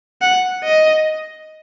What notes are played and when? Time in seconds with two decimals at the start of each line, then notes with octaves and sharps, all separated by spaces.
0.22 F#5
0.64 D#5